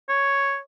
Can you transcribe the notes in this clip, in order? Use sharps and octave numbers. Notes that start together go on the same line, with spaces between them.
C#5